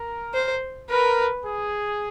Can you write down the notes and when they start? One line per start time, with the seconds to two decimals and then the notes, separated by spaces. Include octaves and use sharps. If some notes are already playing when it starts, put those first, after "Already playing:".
Already playing: A#4
0.34 C5
0.90 A#4 B4
1.45 G#4